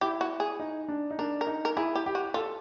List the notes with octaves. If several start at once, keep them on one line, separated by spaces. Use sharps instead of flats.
E4 G4
F#4
G#4
D#4
D4
D#4
D4 A#4
A#4
D#4
A#4
E4 G#4
G4
G4
F#4
F4 A4